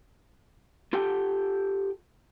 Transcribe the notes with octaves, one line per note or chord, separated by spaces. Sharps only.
F4 G4 A4 G5